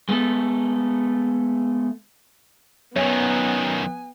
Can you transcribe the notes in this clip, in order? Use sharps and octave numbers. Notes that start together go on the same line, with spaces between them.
G#3 A3 B3 A4
F#2 D#3 B3 C#5 G#5